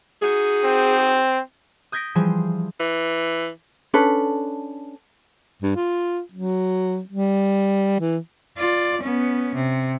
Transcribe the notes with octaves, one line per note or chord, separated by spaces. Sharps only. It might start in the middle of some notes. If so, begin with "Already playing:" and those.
D#4 F#4 G#4
C4
D#6 G6 G#6 A#6 B6 D7
E3 F3 G3 G#4 C5
E3
C#4 D4 A4 B4
G2
F4
F#3
G3
E3
F4 D5
B3 C#4
C3